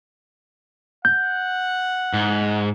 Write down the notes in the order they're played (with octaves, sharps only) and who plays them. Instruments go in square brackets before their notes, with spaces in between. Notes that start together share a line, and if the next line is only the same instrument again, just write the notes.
[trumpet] F#5 [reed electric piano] G6
[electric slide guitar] G#2